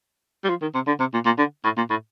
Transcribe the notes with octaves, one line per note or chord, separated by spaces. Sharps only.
G3
F3
D#3
C3
D3
C3
A#2
A#2
D3
A2
A#2
A2